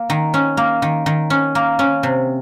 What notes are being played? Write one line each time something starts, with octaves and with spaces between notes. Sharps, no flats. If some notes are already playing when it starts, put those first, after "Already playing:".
Already playing: A#3
D#3
C#4
A#3
D#3
D#3
C#4
A#3
C#4
C3